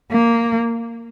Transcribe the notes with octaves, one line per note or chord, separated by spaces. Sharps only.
A#3